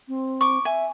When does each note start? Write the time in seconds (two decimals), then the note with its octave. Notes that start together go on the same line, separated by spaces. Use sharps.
0.08 C4
0.41 C#6 D6
0.65 E5 G#5